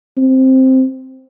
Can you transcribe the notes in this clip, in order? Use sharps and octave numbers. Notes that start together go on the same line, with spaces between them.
C4